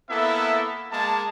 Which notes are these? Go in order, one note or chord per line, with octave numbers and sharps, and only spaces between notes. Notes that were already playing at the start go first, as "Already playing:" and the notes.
A#3 B3 E4 A4 E5
G#3 A#3 A5